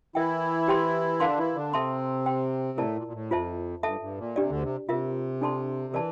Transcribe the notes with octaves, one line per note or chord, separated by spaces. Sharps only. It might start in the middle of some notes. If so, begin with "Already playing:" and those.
E3 E4 A#4 E5 G5
G4 C5 G5 C6
D3 D4 A#4 F5 C6
E3 E4
D3 D4
C3 C4 A4 E5 A5 C6
C5 G5 C6
A2 A3 E4 A#4 D5 A5
A#2
A#2
A2
F2 F4 C5 E5 A5
F2
G2 A4 E5 A5
G2
A#2
C3 D4 G4 D5
D2 D3
C3
C3 F4 A#4 E5
D4 A4 D5 A5 C6
E3 A#4 D5 A5